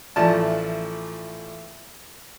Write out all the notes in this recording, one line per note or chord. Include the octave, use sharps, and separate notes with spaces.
A1 F3 A3 D5 A5